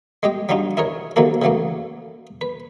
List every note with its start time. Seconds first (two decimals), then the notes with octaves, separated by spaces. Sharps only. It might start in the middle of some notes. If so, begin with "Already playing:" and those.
0.23 G#3 G4 D#5 G5
0.49 F#3 G3 D4 D#4 F4
0.77 E4 G#4 A#4 C#5
1.16 C3 D#3 F#3 A#3 F#4 A4
1.42 C#3 E3 F#3 A3 A#3
2.41 B4